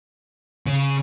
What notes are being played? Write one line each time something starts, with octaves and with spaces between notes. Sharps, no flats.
C#3